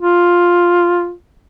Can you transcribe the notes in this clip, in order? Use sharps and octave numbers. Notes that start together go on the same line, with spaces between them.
F4